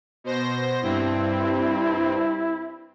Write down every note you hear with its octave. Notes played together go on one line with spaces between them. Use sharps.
B2 C5 A#6
G2 C4 E4